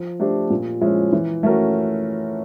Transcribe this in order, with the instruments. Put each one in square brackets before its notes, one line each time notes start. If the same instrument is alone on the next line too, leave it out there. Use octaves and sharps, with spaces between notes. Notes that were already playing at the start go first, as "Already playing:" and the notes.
Already playing: [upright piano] F3
A3 D4 G4 C5
A#2
F3 G#3 C#4 E4
E3
A3 C#4 F#4 A#4